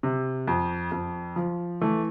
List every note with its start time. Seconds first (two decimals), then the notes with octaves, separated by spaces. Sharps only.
0.03 C3
0.47 F2
0.92 F2
1.36 F3
1.81 E3 A3